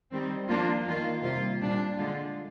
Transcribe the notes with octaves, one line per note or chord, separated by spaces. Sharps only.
D#3 G3 C4
F3 A#3 D4 F4
D#3 A#3 F4
C3 G3 A#3 F4
A#2 G3 D4
D3 G#3 D4 F4